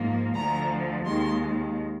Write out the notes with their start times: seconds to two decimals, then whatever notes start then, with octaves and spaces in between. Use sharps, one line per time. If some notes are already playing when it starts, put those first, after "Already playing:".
Already playing: G#2 F3 A#3
0.34 D2 D3 F3 A#5
1.04 D#2 D#3 G#3 C6